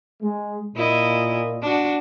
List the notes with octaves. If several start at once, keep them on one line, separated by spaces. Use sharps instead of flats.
G#3
A#2 E4 D#5
D4 F#4